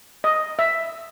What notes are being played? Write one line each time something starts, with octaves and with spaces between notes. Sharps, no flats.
D#5
E5